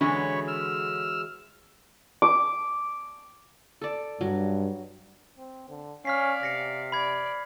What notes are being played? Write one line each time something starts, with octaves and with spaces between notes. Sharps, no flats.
D3 E3 F#3 G#3 C#5 B5 C#6
E6 F6
D6
A4 D5
G2 F#3
C4
D3
C#4 D5 F5 F6 B6 C7
C3 A#6 C7 C#7
D5 B5 G#6